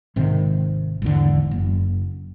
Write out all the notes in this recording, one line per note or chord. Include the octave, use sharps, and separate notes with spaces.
G#1 C3 D#3
G#1 E2 D3
F#1